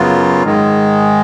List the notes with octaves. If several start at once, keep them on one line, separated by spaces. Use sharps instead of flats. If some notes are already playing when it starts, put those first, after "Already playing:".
Already playing: F#2 C#3 F#3 B3 F4
G#2 D#3 G#3